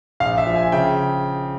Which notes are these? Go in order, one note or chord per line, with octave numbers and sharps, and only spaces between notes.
A#1 F5
E5
F3
G#5
C#3 G5